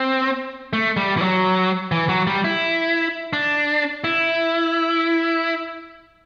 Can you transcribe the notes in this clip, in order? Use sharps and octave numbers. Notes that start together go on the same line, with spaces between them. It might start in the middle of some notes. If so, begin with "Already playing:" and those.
Already playing: C4
A3
G3
E3
F#3
E3
F#3
G3
E4
D4
E4